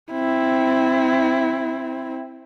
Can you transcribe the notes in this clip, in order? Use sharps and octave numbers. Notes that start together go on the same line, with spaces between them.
C4 E4